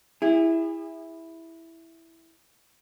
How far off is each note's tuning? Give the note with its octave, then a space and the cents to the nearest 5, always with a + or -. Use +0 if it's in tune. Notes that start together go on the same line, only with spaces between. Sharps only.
E4 +0 G#4 -40